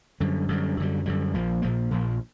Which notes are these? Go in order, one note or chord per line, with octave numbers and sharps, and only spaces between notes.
F#2 D3 G3
F#2 D3 G3
F#2 D3 G3
F#2 D3 G3
A#1 A#2 F3 A#3
A#1 A#2 F3 A#3
A#1 A#2 F3 A#3